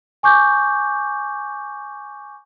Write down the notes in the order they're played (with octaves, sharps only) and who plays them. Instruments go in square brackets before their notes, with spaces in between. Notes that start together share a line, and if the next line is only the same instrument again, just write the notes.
[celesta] G#5 C#6 D6 G6